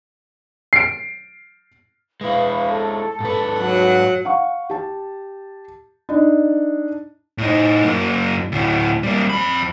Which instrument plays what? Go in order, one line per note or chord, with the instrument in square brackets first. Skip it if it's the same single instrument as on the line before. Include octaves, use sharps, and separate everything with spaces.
[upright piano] C7 D7
[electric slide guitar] G#3 E4 [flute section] B4 F5
[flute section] A4
[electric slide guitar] G#2 B4
[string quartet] F#3 F#5
[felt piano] F5 F#5 C#6
G4 A5
D4 D#4
[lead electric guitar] A2 D#4
F#2 A#3
D2 A2
G3 A#3
F2 B5